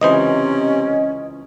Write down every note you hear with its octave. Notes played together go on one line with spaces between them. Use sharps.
C#2 C3 E3 C#4 C5 D#5